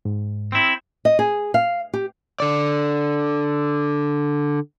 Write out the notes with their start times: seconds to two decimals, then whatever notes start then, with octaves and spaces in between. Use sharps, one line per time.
0.05 G#2
0.52 C4 E4
1.05 D#5
1.19 G#4
1.54 F5
1.93 G4
2.40 D3 D5